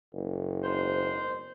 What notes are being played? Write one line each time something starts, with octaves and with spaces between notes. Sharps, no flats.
F#1
G#2 B2 C5